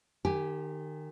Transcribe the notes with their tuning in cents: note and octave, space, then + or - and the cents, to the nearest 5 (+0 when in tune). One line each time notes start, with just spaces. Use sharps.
D#3 -25 G4 +0 G#5 -10